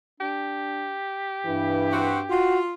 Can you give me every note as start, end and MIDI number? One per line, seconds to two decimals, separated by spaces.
0.20 0.98 62
0.20 2.55 67
1.45 2.37 43
1.45 2.12 52
1.92 2.21 60
1.92 2.21 66
2.30 2.74 65
2.30 2.59 66